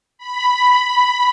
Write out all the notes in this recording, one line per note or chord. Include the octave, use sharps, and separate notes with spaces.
B5